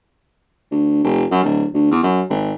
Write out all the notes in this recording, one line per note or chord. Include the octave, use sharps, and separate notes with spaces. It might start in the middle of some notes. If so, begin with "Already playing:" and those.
D2
F1
F#2
D1
D2
E2
F#2
G#1